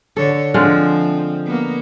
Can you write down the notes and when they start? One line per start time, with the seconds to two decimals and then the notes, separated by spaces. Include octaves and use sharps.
0.17 D3 A4 C#5
0.54 D3 F3 G#3 C4 F4
1.46 A#3 B3